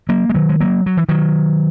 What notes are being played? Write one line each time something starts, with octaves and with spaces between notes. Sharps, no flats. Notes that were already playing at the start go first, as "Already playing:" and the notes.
F#3 A#3
G#3
D#3 F#3
G#3
F#3 A#3
F#3
E3
D#3 F#3